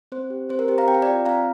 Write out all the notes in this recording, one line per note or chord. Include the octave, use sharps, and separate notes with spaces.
C4 C5
G4
C4 C5
A#4
G4 C5
F5 A#5
C4 G5
F5
D5 G5
F4
C4 F5 A#5